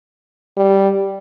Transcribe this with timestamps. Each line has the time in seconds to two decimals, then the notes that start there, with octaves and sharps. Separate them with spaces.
0.57 G3